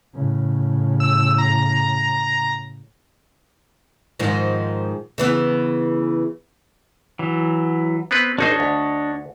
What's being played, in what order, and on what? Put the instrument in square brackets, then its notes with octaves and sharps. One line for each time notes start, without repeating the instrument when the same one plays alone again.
[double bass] A2 C#3
[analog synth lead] E6
A#5
[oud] G#2 D#3 F3
C#3 E3 B3
[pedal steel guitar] E3 F#3
[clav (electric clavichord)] B3 C4 B4
[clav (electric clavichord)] G#1 D#4 C5 [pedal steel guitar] D4 C#5 D#5
[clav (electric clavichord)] D2